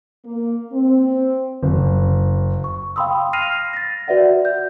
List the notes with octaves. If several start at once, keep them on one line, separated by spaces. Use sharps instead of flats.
A#3
C4
F#1
C#6
F5 G5 B5 C6 D#6 E6
F6 A#6 C7 D#7 F7
A6 A#6
F#4 B4 D5 E5 F#5
G6